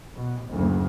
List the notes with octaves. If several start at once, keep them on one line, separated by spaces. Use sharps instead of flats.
B2
F#1 D2